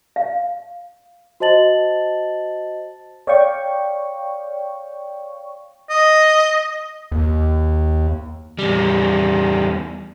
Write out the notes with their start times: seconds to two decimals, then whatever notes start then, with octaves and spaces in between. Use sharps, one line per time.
0.16 F5
1.40 F#4 C5 D#5 A5 A6 F#7
3.27 C#5 D5 F5 G5 C#6
5.90 D#5
7.12 D#2
8.59 E2 G3